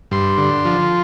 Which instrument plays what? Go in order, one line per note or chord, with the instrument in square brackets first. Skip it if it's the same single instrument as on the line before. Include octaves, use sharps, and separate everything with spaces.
[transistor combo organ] G2 C6
D3
F3